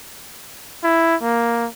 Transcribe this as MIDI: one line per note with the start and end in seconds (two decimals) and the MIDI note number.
0.84 1.16 64
1.22 1.67 58